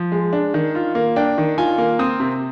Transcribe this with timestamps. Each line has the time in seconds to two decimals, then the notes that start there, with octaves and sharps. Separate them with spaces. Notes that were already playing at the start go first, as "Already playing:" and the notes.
Already playing: F3
0.12 G#3
0.33 D4
0.54 D#3
0.75 F4
0.95 A#3
1.16 D4 G5
1.38 D#3
1.58 F4 G#5
1.78 A#3
1.99 C4 D#6
2.20 C3